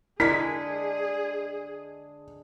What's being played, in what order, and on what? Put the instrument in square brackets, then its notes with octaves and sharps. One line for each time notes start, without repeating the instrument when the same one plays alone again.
[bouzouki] D3 G#3 [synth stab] E4 A#4 [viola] G#4 [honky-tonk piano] B6